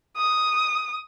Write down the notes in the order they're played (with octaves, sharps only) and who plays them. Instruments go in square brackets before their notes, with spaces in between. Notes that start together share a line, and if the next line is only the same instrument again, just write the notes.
[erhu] D#6